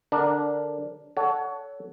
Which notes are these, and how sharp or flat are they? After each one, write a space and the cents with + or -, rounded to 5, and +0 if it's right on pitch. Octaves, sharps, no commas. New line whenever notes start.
D3 +10 D4 +0 A#4 +0
A4 +0 C#5 +30 F#5 +0